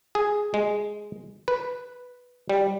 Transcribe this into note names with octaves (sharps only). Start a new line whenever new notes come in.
G#4
G#3
B4
G3